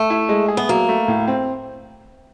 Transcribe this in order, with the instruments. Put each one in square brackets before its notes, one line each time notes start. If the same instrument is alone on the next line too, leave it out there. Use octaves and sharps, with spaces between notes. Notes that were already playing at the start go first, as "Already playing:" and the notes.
Already playing: [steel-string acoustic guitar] A3
[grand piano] E4
G#3
G#4
[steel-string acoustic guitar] B3
[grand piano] F#3 [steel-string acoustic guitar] A#3
[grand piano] A3
A2
C4